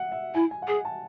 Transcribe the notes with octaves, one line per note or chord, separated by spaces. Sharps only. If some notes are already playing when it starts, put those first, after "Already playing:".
Already playing: E5 F#5
E5
E4 G#5
G#5
F#5
G#4 G#5
A5